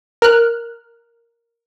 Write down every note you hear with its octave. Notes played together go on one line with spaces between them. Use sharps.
A#4 F6 F#6